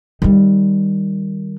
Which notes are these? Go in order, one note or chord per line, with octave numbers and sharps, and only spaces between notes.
D#3 G3